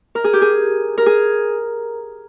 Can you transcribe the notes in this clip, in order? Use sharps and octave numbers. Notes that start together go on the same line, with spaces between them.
A#4
G#4
G4
G#4
A#4
G#4